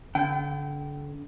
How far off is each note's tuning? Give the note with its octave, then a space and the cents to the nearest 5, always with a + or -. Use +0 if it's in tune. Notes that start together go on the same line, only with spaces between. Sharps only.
D3 -30 G5 -25